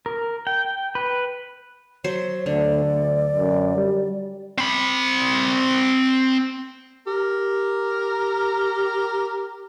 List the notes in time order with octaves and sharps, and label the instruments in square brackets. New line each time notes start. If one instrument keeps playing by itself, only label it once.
[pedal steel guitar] A#4
G5
B4
[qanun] F#3 C5 [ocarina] C#5
[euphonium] D2 [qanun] D3 [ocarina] D5
[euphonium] D2
F#2
G3
[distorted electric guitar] C4 B5
[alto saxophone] G4 [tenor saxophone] A#4